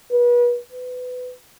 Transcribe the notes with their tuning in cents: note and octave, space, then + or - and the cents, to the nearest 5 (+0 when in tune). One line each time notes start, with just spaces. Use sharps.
B4 -35
B4 +20